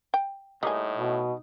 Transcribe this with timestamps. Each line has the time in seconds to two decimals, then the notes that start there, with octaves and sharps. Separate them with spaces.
0.14 G5
0.63 A2 G3 A#3 D#4 G#4
0.97 B2